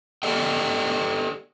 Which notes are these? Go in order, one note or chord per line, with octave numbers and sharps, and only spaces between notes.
G4 A4 D5 D#5 G5